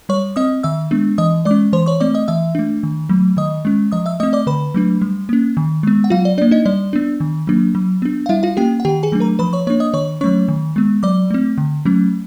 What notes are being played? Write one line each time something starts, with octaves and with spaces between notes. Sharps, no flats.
G3 C#5 C#6
C4 D#5 D#6
D#3 E5 E6
G#3 B3 D4
E3 D#5 D#6
G#3 D5 D6
C#4
E3 C5 C6
C#5 C#6
A3 C4 D5 D6
D#5 D#6
E3 E5 E6
A3 D4
D#3
F#3 A3
D#3 D#5 D#6
G#3 C#4
F3 D#5 D#6
E5 E6
A3 C4 D#5 D#6
D5 D6
D3 B4 B5
F#3 A3 D4
G3
A#3 C#4
D#3
G#3 B3
F#5
F#3 F4 F5
D5
A#3 D4 D5
D#4 D#5
G3 D5
B3 D4
D#3
F#3 A#3 D4
F#3
B3 D4
F5
G3 E4 E5
F4 F5
A#3 C#4 G4 G5
F#5
D#3 G4 G5
G#4 G#5
F#3 A3 D4
A#4 A#5
F3 B4 B5
C#5 C#6
A#3 D4 C#5 C#6
D#5 D#6
D#3 C#5 C#6
F#3 A3 C#4 C#5 C#6
D#3
G#3 B3
F#3 D5 D6
A3 C4
D3
F#3 A3 C#4